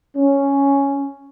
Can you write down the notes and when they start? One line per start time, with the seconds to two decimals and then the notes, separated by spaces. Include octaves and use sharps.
0.17 C#4